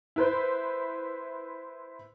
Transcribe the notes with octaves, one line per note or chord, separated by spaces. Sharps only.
E4 B4 C5